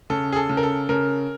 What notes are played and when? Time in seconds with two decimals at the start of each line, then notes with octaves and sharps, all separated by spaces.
0.10 C#3 A4
0.32 G#4
0.36 A4
0.49 C#3
0.57 A#4
0.63 A4
0.89 C#3 A#4